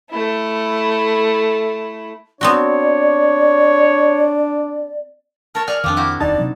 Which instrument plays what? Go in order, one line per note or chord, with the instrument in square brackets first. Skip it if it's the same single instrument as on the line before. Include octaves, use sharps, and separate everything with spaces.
[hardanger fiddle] A3 E4
[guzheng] B3 C4 F#4 [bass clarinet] D4 [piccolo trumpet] C#5 [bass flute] D5
[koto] A#4 C#5 [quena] A5
[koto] G#4 G#5 [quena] D5 [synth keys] F6
[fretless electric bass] F2 D#3 [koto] F3 C4 D4 [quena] D6
[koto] E4 F#4 G4
[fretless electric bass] D#1 E2 D#3 [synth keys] D#4 A5 [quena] D5
[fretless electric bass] C3 F#3 C4